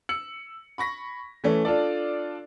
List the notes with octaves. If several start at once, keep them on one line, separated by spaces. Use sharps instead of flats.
E6 C#7 F#7
B5 C#6 A#6 B6
E3 A3 C#4
D4 F4 A4 D5